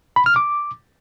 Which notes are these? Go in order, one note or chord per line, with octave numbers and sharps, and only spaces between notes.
B5
F6
D6